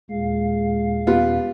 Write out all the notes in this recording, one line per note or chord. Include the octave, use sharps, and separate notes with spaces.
D#2 A#2 G#3 F5
G3 B3 F4